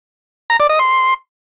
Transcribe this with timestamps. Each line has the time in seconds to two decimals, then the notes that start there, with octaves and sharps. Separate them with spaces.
0.50 A#5
0.60 D5
0.69 D#5
0.79 C6